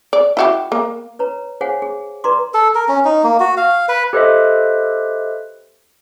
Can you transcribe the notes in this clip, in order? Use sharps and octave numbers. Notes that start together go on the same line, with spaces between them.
D5
E4 F#4 G4
A#3
B4 C#5 A#5
G#4 C5 C#5 F5 F#5 G#5
G#4
B4 D5 A#5 C6 D6
A4
A#4
C#4
D#4
A#3
F#4
F5
B4
G4 A4 B4 C5 D#5 E5